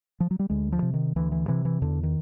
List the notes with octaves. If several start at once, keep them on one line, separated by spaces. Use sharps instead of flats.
F3
F#3
G3
D2 G#3
F3
C3
D#3
D2 E3
E3
C3 E3
E3
E2 D3
D#3